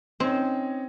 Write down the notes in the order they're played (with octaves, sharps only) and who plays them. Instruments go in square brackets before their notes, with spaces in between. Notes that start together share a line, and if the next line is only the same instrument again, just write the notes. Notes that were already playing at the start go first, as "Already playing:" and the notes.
[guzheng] C4 [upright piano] C#4 D#4